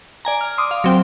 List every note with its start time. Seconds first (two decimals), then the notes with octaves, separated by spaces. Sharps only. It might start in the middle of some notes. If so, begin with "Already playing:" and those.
0.25 D5 G#5 A#5
0.41 F6
0.58 C6 D6 D#6
0.71 F5
0.84 F#3 C4 G5